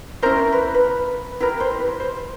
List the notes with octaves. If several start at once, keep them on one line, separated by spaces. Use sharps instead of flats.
C#4 E4 G4 A#4 C5
B4
B4
E4 G4 A#4 B4
C5
B4
C5